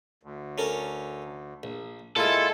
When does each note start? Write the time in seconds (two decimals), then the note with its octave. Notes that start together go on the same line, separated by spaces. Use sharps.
0.23 D2
0.58 C#4 A4 A#4
1.63 A#1
2.16 A#2 G#3 E4 F4 A4